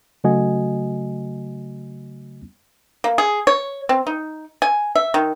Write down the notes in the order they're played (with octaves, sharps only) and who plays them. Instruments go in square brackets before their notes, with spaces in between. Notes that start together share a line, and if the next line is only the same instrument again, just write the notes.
[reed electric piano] C#3 F#3 A3 F#4 D#5 G#5
[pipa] A#3
G#4
C#5
C4
D#4
G#5
E5
D#3